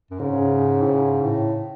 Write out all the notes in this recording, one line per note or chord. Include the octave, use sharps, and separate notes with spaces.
F#2
G#2 C#3
A2
G#2
A2